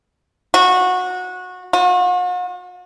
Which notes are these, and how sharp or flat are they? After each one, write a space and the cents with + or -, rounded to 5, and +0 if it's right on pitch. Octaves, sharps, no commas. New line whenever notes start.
F#4 -20
F#4 -45